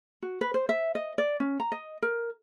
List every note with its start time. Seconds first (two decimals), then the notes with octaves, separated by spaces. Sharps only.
0.22 F#4
0.41 B4
0.54 C5
0.69 E5
0.95 D#5
1.18 D5
1.40 C#4
1.60 A#5
1.72 D#5
2.02 A#4